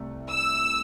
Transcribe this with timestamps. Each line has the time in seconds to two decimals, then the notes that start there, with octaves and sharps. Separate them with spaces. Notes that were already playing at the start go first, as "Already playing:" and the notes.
Already playing: C2 C3 A3
0.30 E6